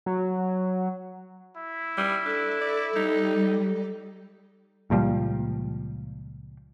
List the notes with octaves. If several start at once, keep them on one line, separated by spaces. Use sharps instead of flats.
F#3
E4
G3
D4 A4
D5
G3 D#4
C#2 A#2 F3 G3